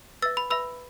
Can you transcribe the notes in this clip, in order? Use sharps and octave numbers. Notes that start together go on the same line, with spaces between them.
B4 E5 E6 A6
B5
B4 E5 B5 E6